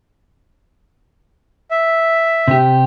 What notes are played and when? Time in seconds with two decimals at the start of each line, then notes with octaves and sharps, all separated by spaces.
1.71 E5
2.48 C3 G4